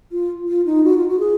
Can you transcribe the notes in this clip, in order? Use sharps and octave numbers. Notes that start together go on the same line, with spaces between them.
F4
F4
D#4
F#4
F4
F#4
G#4